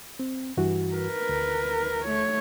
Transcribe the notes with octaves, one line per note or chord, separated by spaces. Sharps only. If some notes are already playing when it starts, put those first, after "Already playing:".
C4
G2 E3 F#4
A#4 B4
D2
A3 C#5